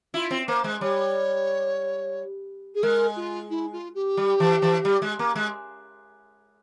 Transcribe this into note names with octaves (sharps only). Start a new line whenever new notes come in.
E4 F4
C4
A#3 C5
G#3
G3 C#5
G#4
G#3 A#4
F4
E4
F4
G4
G3
E3
E3
G3
G#3
A#3
G#3